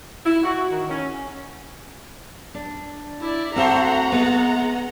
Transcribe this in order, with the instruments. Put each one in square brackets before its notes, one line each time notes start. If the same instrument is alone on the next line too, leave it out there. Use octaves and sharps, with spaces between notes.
[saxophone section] E4
F#4
D#3
C#4
[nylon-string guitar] D4
[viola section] E4 D5
[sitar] A3 F#4 C5 [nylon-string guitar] C4 A4 [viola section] F#5 A#5
[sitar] G#3 [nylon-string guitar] B3